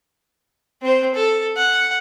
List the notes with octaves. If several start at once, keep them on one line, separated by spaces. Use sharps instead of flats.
C4 C5
A4
F#5